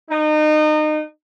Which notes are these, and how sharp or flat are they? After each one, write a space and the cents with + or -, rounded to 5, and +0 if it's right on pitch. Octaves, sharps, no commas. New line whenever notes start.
D#4 -30